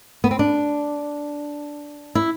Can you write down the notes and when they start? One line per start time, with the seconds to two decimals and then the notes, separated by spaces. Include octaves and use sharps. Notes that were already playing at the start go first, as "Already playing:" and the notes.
0.24 B3
0.31 C4
0.39 D4
2.15 E4